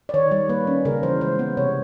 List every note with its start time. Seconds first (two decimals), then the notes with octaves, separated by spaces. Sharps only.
0.09 D5
0.14 D#3 C#5
0.31 G3 C#5
0.49 A#3 B4
0.67 C#4
0.85 C#3 A#4
1.03 E3 C5
1.21 G#3 C5
1.39 B3
1.57 C3 C#5